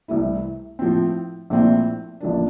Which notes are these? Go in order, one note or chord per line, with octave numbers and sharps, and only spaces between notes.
C2 C3 E3 A3 E4
A2 F3 C4
A#1 A#2 A3 C4 E4
A1 A2 F3 A#3 D4